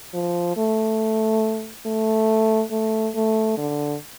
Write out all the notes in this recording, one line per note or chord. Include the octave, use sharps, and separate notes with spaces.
F3
A3
A3
A3
A3
D3